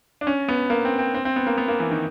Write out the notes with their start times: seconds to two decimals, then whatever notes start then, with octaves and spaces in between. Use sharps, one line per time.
0.21 D4
0.27 C#4
0.48 B3
0.70 A#3
0.85 C4
0.99 C4
1.15 C4
1.25 C4
1.36 B3
1.47 A#3
1.58 B3
1.68 A#3
1.80 E3
1.91 D#3